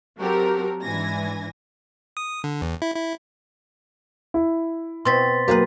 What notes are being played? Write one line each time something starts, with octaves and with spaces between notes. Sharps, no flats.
F#3 C4 F#4 G4 A4 A#4
G#2 E3 D4 G#5 G#6 A#6
D#6
D3
E2
E4
E4
E4
B2 C4 C6 A6 B6
F#3 A#3 G4 G#4 B4